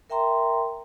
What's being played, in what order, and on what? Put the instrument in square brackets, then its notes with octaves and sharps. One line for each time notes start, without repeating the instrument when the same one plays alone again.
[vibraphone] A#4 E5 G5 A#5 C6